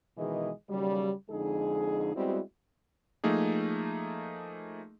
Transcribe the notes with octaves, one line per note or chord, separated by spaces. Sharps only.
B2 D#3 E3 G#3 G#4 D#5
D#2 C#3 F#3 G3
F2 D3 G#3 D#4 G#4
G3 G#3 B3 C4 E4 F#4
F3 A3 A#3 D#4 G#4